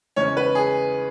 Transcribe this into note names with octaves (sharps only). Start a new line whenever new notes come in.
E2 C#3 G#3 C#4 C#5
B4
G#4